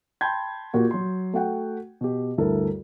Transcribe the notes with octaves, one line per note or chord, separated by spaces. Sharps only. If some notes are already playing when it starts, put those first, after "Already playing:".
G5 A5 B5 C6 G6 G#6
A#2 A#3 F#4 G4
F#3 C6
A3 F#4 F#5 G5
B2 G4
D2 G2 E4 A4 A#4